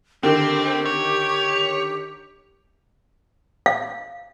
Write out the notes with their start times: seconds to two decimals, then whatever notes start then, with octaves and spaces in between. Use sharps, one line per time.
0.23 D3 D#3 C4 G4
0.85 C#5
3.66 F5